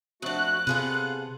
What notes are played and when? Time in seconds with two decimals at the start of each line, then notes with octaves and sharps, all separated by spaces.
0.22 F2 A3 D4 F#4 F#6
0.67 C3 B3 F4 G#4 A4